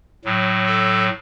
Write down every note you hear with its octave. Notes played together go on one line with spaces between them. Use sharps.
A2 F#3
A4